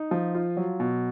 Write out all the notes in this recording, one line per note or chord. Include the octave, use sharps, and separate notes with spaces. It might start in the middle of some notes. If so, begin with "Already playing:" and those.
Already playing: D#4
F3
F4
F#3
B2